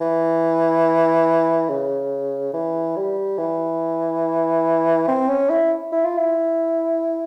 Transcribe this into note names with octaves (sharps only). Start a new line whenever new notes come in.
E3
C#3
E3
G3
E3
C4
C#4
E4
E4
F4
E4